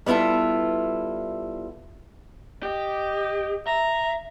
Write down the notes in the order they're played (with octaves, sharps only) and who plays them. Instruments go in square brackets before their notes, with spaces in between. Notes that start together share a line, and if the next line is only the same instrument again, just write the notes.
[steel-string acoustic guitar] G3 B3 E4 F4 A4
[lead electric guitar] G4 [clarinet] D#5
[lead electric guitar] E5 [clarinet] A#5